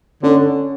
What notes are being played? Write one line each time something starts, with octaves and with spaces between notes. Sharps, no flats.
D3 C#4